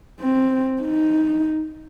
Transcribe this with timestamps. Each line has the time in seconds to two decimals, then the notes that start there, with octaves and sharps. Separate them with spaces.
0.21 C4
0.82 D#4